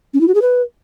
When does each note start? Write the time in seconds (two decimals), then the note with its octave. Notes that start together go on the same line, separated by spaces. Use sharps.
0.14 C#4
0.21 E4
0.28 F#4
0.35 G#4
0.42 B4